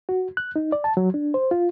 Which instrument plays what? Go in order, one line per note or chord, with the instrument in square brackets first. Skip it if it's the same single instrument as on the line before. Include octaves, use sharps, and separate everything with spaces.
[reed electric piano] F#4
F#6
D#4
D5
A5
F#3
D4
C5
F4